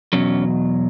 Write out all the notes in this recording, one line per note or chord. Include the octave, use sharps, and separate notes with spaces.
E2 B2 F#3 C#4